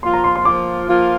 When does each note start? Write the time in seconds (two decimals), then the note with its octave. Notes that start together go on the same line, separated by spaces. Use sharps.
0.03 F3 A#3 F4 C6
0.14 A#5
0.24 C6
0.36 C6
0.45 F3 A#3 F4 D6
0.89 F3 A#3 F4